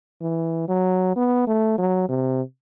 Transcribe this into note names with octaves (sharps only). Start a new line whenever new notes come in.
E3
F#3
B3
A3
F#3
C3